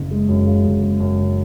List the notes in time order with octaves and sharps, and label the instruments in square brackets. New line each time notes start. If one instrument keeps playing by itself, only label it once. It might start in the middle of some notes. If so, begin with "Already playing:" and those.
Already playing: [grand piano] F#1 C#3
G#3
F#2
C#3
F#1
G#3
F#2
C#3